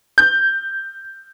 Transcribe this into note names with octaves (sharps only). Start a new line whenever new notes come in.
G6